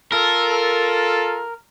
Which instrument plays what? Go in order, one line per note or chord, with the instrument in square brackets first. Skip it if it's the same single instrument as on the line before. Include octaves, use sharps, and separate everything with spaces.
[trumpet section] F4 A4 [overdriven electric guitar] A#4